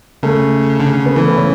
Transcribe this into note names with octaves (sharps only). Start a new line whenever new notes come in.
C#3 A3
D3
C#3
B3
E3 A3
B3
C#3 C#4